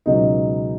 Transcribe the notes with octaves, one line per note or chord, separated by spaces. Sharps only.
C#2 B2 F#3 D#4